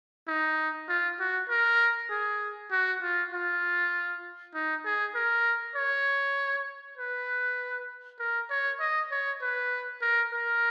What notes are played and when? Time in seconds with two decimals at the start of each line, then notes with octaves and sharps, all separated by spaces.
0.28 D#4
0.89 F4
1.20 F#4
1.50 A#4
2.10 G#4
2.72 F#4
3.02 F4
3.32 F4
4.54 D#4
4.85 G#4
5.15 A#4
5.76 C#5
6.98 B4
8.19 A#4
8.50 C#5
8.80 D#5
9.12 C#5
9.42 B4
10.02 A#4
10.33 A#4